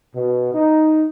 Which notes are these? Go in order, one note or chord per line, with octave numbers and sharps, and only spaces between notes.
B2
D#4